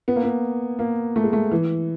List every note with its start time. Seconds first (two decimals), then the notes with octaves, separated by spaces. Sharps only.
0.08 B3
0.16 A#3
0.24 B3
0.79 A#3
1.16 A3
1.24 G#3
1.33 A3
1.51 E3